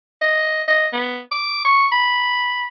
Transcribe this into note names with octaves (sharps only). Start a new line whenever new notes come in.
D#5
D#5
B3
D6
C#6
B5